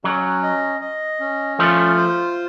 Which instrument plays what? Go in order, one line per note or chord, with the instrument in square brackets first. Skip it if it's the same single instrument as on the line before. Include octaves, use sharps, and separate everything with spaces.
[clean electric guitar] F#3 [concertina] C#4
[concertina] D#5
D#5
C#4
[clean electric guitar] F3 A3 [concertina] F4
[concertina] C5